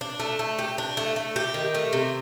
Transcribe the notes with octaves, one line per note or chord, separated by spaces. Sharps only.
D4
A3
A3
G4
D4
A3
A3
G4
D#3
A3
C3